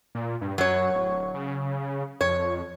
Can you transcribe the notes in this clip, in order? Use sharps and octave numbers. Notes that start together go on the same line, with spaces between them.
A#2
G2
F#2 F#3 C#5
D1
C#3
F2 C#5